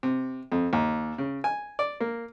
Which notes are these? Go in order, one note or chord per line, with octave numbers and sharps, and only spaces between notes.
C3
F2
D#2
C#3
G#5
D5
A#3